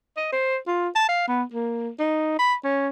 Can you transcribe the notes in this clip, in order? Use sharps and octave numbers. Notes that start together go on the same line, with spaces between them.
D#5
C5
F4
A5
F5
B3
A#3
D#4
B5
C#4